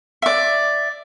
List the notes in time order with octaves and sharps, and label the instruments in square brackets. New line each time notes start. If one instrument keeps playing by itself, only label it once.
[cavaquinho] D5 E5